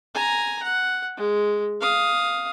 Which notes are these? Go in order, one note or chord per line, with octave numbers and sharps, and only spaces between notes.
G#5 A#5
F#5
G#3
F5 D#6